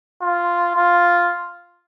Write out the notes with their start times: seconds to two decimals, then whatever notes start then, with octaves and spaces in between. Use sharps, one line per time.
0.22 F4
0.76 F4